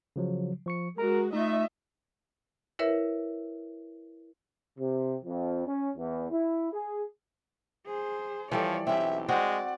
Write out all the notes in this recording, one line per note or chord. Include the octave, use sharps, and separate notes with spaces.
C#3 F3 F#3
F3 C#6 C#7
G#3 F#4 A#4 A#5
A3 D#4 F4 D#5 E5
E4 A#4 B4 C#5 E5
C3
F2
C#4
E2
E4
G#4
G#4 C5
E3 F3 G3 A4 C#5 D5
B1 C4 C#4 G4 E5
G#3 C4 F#4 C5 D5 F#5